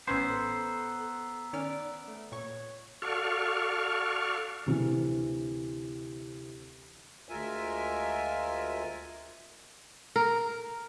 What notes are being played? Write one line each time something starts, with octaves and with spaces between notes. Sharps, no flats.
A1 B3 C#4 B4 C5 G#5 A#5 E6
A4
D#3 C#4 D5 F6
A3
A#2 C#5 C#6
F#4 A4 D5 F5 C#6 F6
D2 C3 E3
D2 G#3 F4 A#4 E5 G#5
A#4